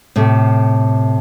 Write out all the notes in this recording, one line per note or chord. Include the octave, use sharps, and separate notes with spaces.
A2 C3